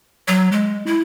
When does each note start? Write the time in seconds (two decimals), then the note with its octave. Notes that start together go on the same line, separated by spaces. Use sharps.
0.28 F#3
0.52 G#3
0.87 E4